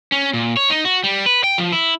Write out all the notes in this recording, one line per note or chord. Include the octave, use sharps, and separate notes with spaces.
C#4
A#2
C#5
D#4
F#4
G3
B4
G5
F3
E4